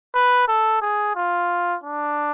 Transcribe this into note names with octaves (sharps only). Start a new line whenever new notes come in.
B4
A4
G#4
F4
D4